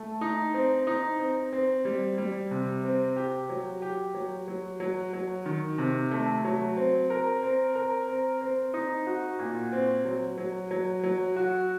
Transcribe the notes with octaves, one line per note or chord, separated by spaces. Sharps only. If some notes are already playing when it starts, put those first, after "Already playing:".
Already playing: A3
D#4
C4
D#4
C4
C4
G3
G3
C3
C4
G4
F#3
G4
F#3
F#3
F#3
F#3
D#3
C3
A3
F#3
C4
A#4
C4
A#4
C4
C4
D#4
F#4
A#2
C4
F#3
F#3
F#3
F#3
F#4